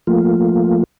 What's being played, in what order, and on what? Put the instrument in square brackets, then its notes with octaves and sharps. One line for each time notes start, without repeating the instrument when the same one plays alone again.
[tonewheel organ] F3 A3 A#3 F4